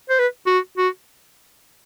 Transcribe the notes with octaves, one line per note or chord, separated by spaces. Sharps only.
C5
B4
F#4
F#4